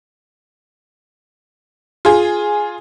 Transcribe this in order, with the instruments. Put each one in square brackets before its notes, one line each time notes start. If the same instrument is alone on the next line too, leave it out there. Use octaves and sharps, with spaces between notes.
[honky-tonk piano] F4 G#4